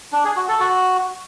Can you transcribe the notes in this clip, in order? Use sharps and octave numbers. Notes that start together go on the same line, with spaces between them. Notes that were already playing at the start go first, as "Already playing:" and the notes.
D4
G#4
F#4
A4
F#4